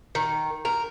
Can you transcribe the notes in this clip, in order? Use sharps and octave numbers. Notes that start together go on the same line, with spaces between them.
D#3
A#4